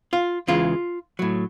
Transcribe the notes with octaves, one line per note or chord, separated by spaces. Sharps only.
F4
E2 C#3 E3 G#3 F4
A2 F#3